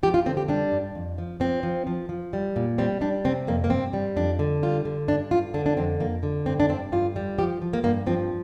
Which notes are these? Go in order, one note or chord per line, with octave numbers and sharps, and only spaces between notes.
F3 G4
F4
D3 C4
G4
G3 D4
G2
F2
F3
F3 C4
F3
F3
F3
G3
A#2
G3 C4
G3 D4
C3 C4
F2 A#3
A#3
G2 C4
G3
F2 D4
D3
G3 F4
D3
G2 D4
G2 F4
D3 D4
D4
F2 C4
F2 A#3
D3
G2 C4
D4
G2 C4
G2 F4
G3
F3 G4
F3
A#3
G2 A#3
F3 C4